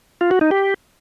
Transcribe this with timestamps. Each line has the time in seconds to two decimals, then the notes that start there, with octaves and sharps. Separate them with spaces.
0.21 F4
0.31 F#4
0.41 D#4
0.51 G4